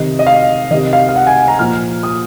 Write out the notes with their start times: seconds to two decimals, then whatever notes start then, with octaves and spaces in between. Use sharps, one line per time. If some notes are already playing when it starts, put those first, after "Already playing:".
Already playing: C3 D#3 D#5
0.19 D#5
0.26 F5
0.71 C3 D#3 D#5
0.93 F5
1.09 F5
1.16 F#5
1.27 G#5
1.48 A#5
1.59 A#2 F3 F6
2.03 D#6